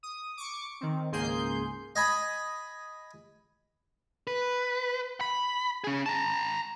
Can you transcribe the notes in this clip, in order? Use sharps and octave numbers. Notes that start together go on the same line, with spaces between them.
D#6
C#6 D6
D#3 C4
C#2 G#2 A#3 G#4 C6 G6
D#5 G#5 B5
B4
B5
C#4 G#4
A5 A#5